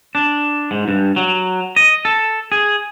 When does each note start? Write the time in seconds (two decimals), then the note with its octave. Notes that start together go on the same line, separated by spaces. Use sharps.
0.15 D4
0.71 G#2
0.88 G2
1.16 F#3
1.76 D#5
2.05 A4
2.52 G#4